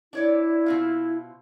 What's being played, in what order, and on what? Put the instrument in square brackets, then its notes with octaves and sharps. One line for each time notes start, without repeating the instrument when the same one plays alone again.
[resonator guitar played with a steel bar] D4 C#5 D5 [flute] E4
[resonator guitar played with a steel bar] B2 C4 F4